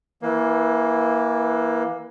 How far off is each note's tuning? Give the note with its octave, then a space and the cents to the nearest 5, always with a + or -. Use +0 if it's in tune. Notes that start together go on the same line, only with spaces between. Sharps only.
E3 -5 A#3 +20